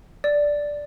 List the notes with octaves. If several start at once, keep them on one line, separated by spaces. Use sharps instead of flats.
D5